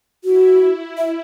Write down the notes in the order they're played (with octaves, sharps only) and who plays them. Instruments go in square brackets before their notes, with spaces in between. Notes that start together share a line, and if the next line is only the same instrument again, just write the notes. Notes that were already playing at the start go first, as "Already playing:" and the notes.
[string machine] E4 [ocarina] F#4
[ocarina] E5